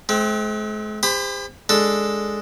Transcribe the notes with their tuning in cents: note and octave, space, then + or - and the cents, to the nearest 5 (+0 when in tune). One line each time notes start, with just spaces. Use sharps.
G#3 +45 C4 +5
G4 +45 C5 -20 B5 +10
G#3 +0 D4 +0 A4 +0